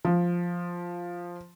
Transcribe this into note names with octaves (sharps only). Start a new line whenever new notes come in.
F3